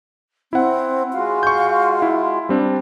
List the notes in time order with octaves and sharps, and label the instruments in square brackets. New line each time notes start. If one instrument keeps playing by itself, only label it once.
[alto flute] C4 [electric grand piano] E4 F#5
[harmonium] G#3 F4 F#4 [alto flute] F5
[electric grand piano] C#6 G6
E4
G3 C4 D4